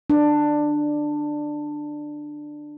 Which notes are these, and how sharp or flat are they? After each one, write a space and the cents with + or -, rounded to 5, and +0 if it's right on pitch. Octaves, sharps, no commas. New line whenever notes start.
D4 +15